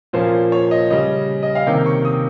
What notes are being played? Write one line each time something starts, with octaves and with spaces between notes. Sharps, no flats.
A#2 F3 A#3 C#4 C5
C#5
D#5
C#3 G3 C#4 D#5
D#5
F5
C3 D#3 A#3 C#4 G5
C#6
D#6